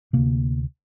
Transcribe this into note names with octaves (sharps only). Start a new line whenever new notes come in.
D2 C3 A#3